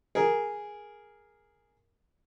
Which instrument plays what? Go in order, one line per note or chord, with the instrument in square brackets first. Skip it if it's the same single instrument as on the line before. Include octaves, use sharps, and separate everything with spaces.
[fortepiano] G#4 A#4